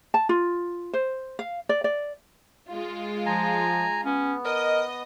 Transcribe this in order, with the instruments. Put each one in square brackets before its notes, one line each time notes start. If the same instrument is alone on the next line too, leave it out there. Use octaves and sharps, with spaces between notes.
[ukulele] A5
F4
C5
F5
D5
D5
[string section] G#3 F4
[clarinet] F3 [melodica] G#5 A#5
[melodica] B3 [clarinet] C#4
[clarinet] A#4 [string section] D#5